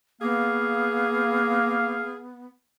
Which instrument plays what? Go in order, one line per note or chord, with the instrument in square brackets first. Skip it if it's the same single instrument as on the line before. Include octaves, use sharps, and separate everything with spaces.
[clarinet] A#3 [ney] B3 [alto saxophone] G#4 [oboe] F5